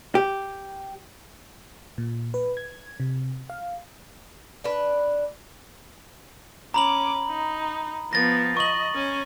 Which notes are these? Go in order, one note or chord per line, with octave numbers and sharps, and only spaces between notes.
G4
A#2
B4
G#6
C3
F5
D4 B4
C#4 A#5 B5 D6 F#7
D#4
F3 B3 A6 A#6
D#5 C#6 F#7
C#4 G#5